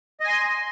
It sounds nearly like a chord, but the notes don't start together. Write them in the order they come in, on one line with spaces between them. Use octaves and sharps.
D#5 G#5 C6